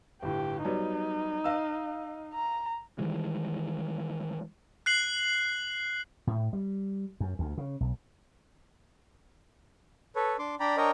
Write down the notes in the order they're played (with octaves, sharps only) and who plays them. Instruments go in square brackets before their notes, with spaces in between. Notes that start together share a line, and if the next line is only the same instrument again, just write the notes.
[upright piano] G1 A2 [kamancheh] G4
[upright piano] F#3 G3 B3 [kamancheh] D#4
[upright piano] D#5 F5 E6
[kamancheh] A#5
[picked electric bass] D#3 E3 G3 G#3
[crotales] F#6 C7 F#7
[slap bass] A2
G3
F#2
D2
C#3
B1
[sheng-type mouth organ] A4 B4 C#5
D4 C6 D6
D4 D5 G5 A#5 B5
D4 A#4 C#5 D#5 G5 A#5